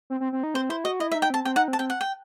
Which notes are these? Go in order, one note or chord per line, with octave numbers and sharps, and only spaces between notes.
C4
C4
C4
D#4
C4 C5
E4 C5
F#4 D#5
E4 D#5
E5
D#4
G5
C4 A5
C4 G5
D#4 F#5
C4
A5
C4 G5
F#5
G5